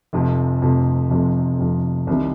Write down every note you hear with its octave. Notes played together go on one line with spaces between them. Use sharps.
F1 F2 C3
F1 F2 C3
F1 F2 C3
F1 F2 C3
C2 C3 D#3 G3